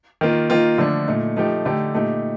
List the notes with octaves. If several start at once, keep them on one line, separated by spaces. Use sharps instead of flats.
D#3 A#3 F4
D#3 A#3 F4
D3 F3 A3 D4
A#2 A3 D#4
F3 A3 D#4 G4
D3 A3 D#4 G4
A#2 A3 D#4 G4